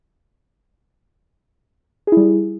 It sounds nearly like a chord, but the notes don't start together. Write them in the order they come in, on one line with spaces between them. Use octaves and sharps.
G#4 E4 G3